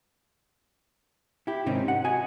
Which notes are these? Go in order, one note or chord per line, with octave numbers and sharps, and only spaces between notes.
E4 G4
G#2 C3 D#3 C4 C#4 D#4
F#5
F#4 D#5 G#5